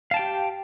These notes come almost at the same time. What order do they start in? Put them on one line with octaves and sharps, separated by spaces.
F5 A5 G5 G4